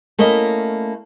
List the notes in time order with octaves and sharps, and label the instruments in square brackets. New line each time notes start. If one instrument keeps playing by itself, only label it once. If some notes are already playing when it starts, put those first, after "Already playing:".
[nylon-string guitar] A3 A#3 C#4 E4 D#5